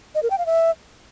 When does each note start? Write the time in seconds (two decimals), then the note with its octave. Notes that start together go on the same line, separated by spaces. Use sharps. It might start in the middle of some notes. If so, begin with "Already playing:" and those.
0.15 D#5
0.23 A#4
0.31 G5
0.38 F5
0.46 E5